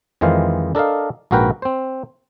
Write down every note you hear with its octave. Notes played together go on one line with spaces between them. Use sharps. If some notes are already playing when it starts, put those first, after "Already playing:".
F2 D#3 E3 G#3 C5 F5
D4 A4 A#4 D#5 F5
A#1 G#2 F#4 A#4 B4 G5
C4 C5